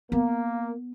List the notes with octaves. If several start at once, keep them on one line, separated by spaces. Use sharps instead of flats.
A#3 B3